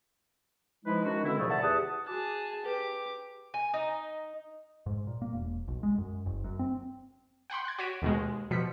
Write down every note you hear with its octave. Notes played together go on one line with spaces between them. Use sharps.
E3 F3 G#3 D#4 E4 B4
D#3 G#3 C#4 D4 F#4
B2 D3 D#3 G#3 C4 E4
D#2 A#2 C#3 F3 F#3 A3
D5 E5 F#5 A5
E2 G4 G#4 F#5 A5 D#6
F#4 G#4 A5 D6 F#6
G4 G#4 B4 D6
G#5
D#4
G#2
A#2
A#3
E1
B1
G#3
F#2
F#1
F#2
C4
F#5 G5 B5 C6
F#6 G#6
F#4 C#5 B6 D7 D#7
D#2 B2 G#3
B2 F3 B6 C#7